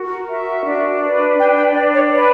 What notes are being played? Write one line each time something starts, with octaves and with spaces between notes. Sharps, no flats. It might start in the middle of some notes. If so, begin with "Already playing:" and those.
Already playing: F#4 A#4
F#4 E5
D4
B4
D4 G5
G5
D4 D5
C#5
B4 D5